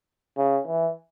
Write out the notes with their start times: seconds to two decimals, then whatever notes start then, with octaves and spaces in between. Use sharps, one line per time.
0.37 C#3
0.67 E3